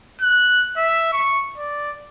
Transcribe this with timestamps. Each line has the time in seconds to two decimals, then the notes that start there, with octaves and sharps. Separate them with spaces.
0.21 F#6
0.77 E5
1.13 C#6
1.58 D5